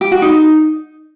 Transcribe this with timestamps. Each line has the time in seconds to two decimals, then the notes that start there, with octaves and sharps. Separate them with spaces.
0.01 G4
0.12 F#4
0.22 D#4